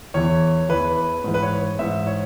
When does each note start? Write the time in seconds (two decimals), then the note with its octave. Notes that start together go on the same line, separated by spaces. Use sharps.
0.14 E2 E3 C#5
0.69 E2 E3 B4
1.24 G#2 E3
1.34 B4
1.42 C#5
1.79 G#2 E3 E5
2.07 C#5